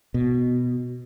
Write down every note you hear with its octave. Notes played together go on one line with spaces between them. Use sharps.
B2